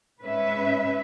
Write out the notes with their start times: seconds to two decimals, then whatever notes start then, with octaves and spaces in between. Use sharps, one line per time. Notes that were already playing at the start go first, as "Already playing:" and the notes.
0.21 G#2 C#4 B4 E5